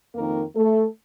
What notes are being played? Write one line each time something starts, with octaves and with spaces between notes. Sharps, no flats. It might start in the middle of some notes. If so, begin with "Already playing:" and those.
F2 D#3 A#3 A#4
A3 A4